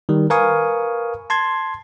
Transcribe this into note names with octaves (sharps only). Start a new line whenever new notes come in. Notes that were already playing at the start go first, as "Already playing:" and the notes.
D#3 G3
A#4 B4 F5 G#5 C#6 D#6
A5 C6 G#6